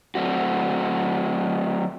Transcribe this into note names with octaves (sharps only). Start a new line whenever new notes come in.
F#3 A3 C4 F#4